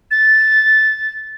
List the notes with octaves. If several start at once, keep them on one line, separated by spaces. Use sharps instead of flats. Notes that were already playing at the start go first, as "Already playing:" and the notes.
A6